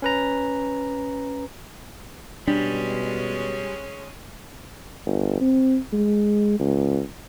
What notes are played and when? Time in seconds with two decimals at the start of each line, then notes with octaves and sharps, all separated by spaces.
0.02 C#4 B4 A#5
2.48 B2 G3 G#3 C#4 D4
5.06 G1
5.41 C4
5.92 G#3
6.59 C#2